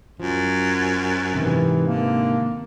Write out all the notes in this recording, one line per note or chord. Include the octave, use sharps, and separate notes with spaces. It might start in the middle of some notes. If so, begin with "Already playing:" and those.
F#2 F3
G#2 C3 D#3 E3
D3 A#3